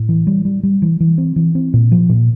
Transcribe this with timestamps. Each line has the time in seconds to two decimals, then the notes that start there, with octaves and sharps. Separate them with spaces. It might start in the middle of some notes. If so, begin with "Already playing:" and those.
Already playing: A2
0.09 E3
0.27 G3
0.45 G3
0.63 G3
0.82 E3
1.00 E3
1.18 C4
1.36 E3
1.55 C4
1.74 A#2
1.92 F3
2.09 A#2